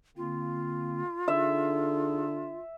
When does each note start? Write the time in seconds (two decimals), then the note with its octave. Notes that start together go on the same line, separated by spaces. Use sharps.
0.17 D3 A#3 C4 F4
1.28 D3 D#4 G#4 A4 E5